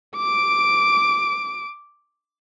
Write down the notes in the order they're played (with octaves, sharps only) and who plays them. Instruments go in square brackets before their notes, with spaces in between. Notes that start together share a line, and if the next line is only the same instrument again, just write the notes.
[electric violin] D6 D7